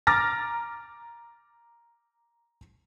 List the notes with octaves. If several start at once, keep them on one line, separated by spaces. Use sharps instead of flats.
A#5 D6 F6 A6 A#6